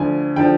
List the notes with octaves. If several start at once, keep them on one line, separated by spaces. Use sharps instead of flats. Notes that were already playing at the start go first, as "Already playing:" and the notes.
Already playing: D2 D3 F3 G#5
D3 F3 G5